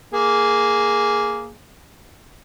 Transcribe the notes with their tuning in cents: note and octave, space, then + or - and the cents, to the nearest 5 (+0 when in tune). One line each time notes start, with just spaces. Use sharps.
A#3 +0 G#4 +0